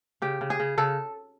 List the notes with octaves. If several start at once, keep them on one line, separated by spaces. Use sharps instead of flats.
C#3 G4
C#3
G#4
C#3
C#3 A4